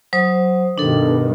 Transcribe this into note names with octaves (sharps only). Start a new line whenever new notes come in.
F#3 C5 D#6
G2 B2 D#3 D4 A4